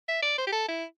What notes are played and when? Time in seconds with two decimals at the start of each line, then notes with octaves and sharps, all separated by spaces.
0.08 E5
0.22 D5
0.38 C5
0.47 G4
0.52 A4
0.68 E4